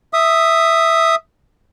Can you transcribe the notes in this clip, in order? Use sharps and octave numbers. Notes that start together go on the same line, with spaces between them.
E5 D#6